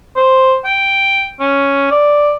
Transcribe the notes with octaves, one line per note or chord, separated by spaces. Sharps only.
C5
G5
C#4
D5